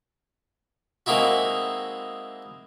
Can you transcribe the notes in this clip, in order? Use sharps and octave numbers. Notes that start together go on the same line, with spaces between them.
G#3 A#3 C4 D#4 E4 F#4